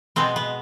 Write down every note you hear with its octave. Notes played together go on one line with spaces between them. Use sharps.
B2 G#3 B3 C4
B3